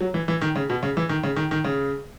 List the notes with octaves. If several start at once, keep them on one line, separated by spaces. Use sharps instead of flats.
F#3
E3
E3
D#3
C#3
B2
C#3
E3
D#3
C#3
D#3
D#3
C#3